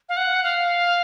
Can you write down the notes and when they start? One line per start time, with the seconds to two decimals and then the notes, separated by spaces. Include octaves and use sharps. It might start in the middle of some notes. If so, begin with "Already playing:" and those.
0.09 F5
0.17 F#5
0.43 F5